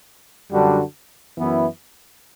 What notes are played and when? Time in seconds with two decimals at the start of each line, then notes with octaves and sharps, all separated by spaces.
0.52 F#2 D3 G3 D4 F#4
1.38 F#2 E3 B3 E4